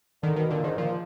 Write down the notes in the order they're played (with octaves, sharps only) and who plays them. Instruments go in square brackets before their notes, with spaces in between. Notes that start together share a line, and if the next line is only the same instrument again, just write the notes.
[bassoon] D3 [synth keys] D#3
[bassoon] B2 [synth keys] D#3
[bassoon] A#2 [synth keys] D3
[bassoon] G#2 [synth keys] D#3
[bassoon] A#2 [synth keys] F3